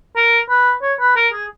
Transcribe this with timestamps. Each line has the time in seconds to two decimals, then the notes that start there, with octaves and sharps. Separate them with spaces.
0.16 A#4
0.49 B4
0.82 C#5
1.00 B4
1.16 A#4
1.33 G#4